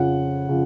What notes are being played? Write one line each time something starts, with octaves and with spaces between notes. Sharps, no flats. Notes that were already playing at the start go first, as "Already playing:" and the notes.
Already playing: F2 C#3 F3 F#5
C#3 F3